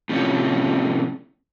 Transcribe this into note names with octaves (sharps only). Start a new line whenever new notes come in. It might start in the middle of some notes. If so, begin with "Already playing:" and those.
A2 C3 F3 C#4